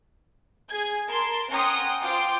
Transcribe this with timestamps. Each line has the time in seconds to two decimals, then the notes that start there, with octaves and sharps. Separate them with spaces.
0.68 G#4 G#6
1.08 A#4 A5 C6
1.49 C#4 F#5 G5 A#5 C6 D#6
2.02 F4 C5 G5 C6 D6